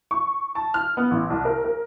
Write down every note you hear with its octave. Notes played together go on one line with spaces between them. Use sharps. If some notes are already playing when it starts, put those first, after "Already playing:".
C#6
A5
F6
B3
A1
C2
A#4
A#4